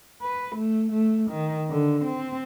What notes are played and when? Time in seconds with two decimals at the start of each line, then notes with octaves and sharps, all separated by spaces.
0.22 B4
0.56 A3
0.92 A3
1.31 D#3
1.71 D3
2.04 C4